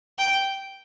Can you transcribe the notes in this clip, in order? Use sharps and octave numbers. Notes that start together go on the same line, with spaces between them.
G5